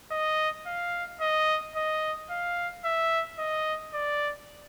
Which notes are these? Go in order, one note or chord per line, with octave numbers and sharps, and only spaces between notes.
D#5
F5
D#5
D#5
F5
E5
D#5
D5